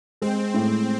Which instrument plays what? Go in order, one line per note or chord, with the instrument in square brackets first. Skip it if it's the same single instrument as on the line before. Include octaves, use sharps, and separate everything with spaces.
[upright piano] G#3 [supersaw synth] C4
[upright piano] A2